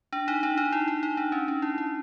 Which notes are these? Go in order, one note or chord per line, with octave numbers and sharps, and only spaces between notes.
D4
D#4
D4
D#4
E4
E4
D#4
D4
C#4
D4
E4
E4